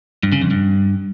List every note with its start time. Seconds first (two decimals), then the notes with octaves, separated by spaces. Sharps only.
0.23 G2
0.32 C#3
0.41 F2
0.51 G2